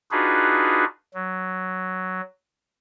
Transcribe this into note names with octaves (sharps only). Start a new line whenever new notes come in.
D4 D#4 F4 F#4 G#4 B4
F#3